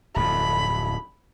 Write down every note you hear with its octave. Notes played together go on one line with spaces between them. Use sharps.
D1 F2 B5